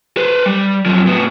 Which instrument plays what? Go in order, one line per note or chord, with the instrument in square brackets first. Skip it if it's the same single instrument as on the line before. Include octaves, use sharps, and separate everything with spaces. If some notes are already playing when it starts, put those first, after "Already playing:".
[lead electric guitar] B4 C5
G3
F#2 F3
A2 B3